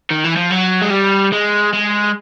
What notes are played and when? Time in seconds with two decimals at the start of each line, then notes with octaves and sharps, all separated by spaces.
0.10 D#3
0.24 E3
0.36 F3
0.51 F#3
0.82 G#3
0.91 G3
1.33 G#3
1.73 G#3